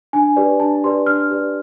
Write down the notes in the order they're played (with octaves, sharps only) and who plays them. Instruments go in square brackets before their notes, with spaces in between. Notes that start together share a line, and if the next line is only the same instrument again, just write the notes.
[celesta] D4 G#5
G4 B4 D5
D4 A5
G4 B4 D5 C6
D4 F6
G4 B4 D5